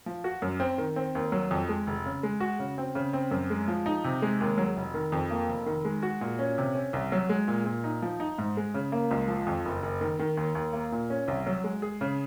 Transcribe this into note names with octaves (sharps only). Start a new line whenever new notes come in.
F3
F#4
F#2
C4
D#3
C4
D#2
F#3
F2
G#3
F1
C#3
G#3
F#4
C#3
C4
C#3
C4
F#2
G#3
F3
D#4
C3
G#3
D#2
F#3
F1
D#3
F2
A#3
F1
D#3
G#3
F#4
A#2
C#4
C3
C#4
C2
F#3
G#3
A#2
A#2
D#4
F3
D#4
G#2
G#3
C#3
A#3
C#2
F3
F2
F#1
F#1
D#3
D#3
D#2
D#2
A#3
A#2
C#4
C2
F#3
G#3
G#4
C#3